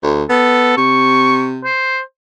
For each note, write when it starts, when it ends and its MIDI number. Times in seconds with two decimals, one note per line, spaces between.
0.03 0.23 38
0.30 0.74 59
0.30 0.73 69
0.77 1.69 48
0.77 1.46 85
1.64 2.00 72